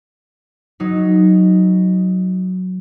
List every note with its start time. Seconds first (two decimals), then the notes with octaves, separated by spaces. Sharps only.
0.80 F#3 D#4